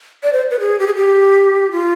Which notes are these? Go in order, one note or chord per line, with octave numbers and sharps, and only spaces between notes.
D5
C5
B4
G#4
G4
G#4
G4
F4